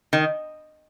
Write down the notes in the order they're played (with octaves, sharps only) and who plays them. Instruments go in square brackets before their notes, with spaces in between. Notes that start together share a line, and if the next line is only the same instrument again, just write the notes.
[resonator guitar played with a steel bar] D#3